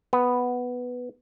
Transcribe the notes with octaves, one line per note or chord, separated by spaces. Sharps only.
B3